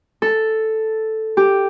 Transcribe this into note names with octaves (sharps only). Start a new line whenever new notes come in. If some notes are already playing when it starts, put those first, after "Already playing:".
A4
G4